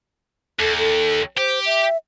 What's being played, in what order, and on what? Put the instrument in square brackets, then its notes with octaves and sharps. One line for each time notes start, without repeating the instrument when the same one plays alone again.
[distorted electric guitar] D#2 [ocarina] A4
[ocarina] A4
[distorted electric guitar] G4 [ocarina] C5
[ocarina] E5